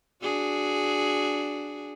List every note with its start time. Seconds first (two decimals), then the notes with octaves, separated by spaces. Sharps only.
0.22 D4 F#4 G#4